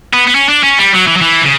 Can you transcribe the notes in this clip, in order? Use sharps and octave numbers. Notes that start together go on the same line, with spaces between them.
B3
B3
C#4
D4
C#4
G3
F#3
E3
F#3
E3
C#3